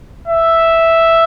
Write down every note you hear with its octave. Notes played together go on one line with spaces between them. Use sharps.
E5